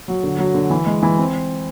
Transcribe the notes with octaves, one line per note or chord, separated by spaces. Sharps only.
F#3
D3
F#3
D3
E3
G#3
E3
C4